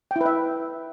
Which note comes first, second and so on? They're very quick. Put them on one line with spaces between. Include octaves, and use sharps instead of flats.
G5 E4 B4 E5